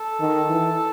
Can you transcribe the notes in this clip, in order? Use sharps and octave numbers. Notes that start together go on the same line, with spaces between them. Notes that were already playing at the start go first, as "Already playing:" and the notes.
Already playing: A4
D#3
E3